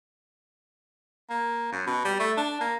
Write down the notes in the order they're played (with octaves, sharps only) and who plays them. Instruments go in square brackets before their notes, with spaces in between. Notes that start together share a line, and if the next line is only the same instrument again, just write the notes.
[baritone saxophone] A#3
F#2
B2
G3
A3
D4
A#3